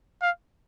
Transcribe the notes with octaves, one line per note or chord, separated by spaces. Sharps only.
F5